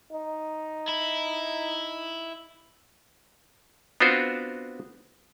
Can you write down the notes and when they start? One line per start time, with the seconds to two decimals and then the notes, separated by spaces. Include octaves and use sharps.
0.12 D#4
0.89 E4
4.00 B3 C4 D4 F4 F#4 C5